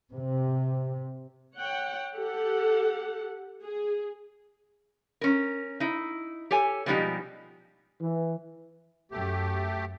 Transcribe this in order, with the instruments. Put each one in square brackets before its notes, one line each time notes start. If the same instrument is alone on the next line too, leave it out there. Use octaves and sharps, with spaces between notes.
[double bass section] C3
[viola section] C#5 F#5 G5
G4 A4 F#5
G#4
[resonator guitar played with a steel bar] C#4 A#4
D#4 E4
G4 A4 C#5 G#5
B2 F3 G3 G#3 D#4 G4
[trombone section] E3
[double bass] F#2 [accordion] A3 G4